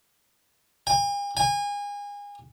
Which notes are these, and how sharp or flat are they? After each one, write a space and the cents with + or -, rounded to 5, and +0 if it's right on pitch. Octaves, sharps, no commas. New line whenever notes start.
G#5 -45
G#5 -30